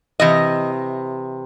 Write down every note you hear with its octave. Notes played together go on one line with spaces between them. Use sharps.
C3 E3 D#5